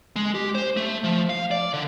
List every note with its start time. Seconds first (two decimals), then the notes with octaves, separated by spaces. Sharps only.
0.16 G#3
0.35 G4
0.55 C5
0.77 A3
1.04 F3
1.30 F5
1.51 D5
1.74 D3